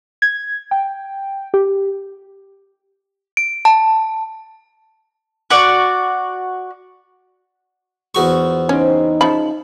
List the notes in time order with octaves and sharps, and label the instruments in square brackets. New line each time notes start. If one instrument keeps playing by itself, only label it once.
[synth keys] G#6
G5
G4
[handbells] D7
A5
[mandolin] F#4 D5
[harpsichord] E2 F#4 C#6 [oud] F3
[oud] C#3 C4 [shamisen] C#4 [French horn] D#4
[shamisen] C#3 F3 B5 [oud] E5